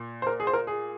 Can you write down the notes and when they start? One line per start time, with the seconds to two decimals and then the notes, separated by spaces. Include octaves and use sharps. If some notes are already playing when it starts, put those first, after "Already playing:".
Already playing: A#2
0.22 C5
0.27 A#4
0.40 G#4
0.47 C5
0.53 A#4
0.67 G#4